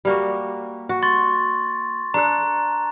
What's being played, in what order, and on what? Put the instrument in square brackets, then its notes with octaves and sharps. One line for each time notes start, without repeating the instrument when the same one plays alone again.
[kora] G3 A#3 F#4
F#4
[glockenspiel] C6 C#6 A6
[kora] D4 A4 [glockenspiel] A#5 F#6